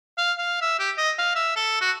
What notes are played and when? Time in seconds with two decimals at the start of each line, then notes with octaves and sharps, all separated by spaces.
0.18 F5
0.38 F5
0.61 E5
0.79 G4
0.98 D#5
1.18 F5
1.36 E5
1.56 A4
1.81 F#4